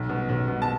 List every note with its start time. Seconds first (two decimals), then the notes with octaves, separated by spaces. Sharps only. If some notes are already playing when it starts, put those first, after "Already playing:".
Already playing: B1
0.09 B2
0.29 B1
0.48 B2
0.62 A5